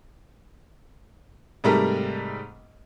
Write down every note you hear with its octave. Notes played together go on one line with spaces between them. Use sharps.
G#2 C3 G3 A3 A#4 A#5